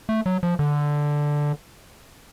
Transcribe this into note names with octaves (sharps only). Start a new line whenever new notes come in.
A3
F#3
F3
D3